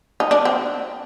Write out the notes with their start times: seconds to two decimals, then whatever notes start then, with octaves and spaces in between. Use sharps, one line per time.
0.20 D#4
0.31 D4
0.45 C4